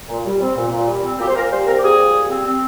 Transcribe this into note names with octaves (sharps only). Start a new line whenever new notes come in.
A#2
G3
C4
A#2
A#2
G3
C4
A#2 G4
C5
A#2 A#4
G3 C5
C4 A#4
G4
A#2 G#4
A#2
G3
C4
C4